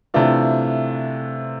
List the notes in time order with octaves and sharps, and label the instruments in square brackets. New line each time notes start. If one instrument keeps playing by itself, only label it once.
[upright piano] C3 E3 A3 D4 F4